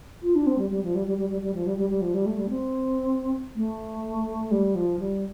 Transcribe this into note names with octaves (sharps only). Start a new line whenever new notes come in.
F4
D4
C4
G3
G3
F3
G3
G3
G3
G3
G3
F3
G3
G3
G3
F3
G3
A3
G3
C4
A3
G3
F3
G3